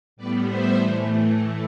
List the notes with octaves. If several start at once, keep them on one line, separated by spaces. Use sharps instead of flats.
A2 G3 B3 B4 D5
C5 E5
A2 E3 A3